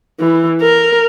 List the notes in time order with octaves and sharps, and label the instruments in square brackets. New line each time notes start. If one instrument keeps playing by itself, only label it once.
[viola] E3
A#4